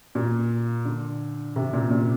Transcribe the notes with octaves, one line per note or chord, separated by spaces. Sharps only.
A#2
D3
C3
A#2
A#2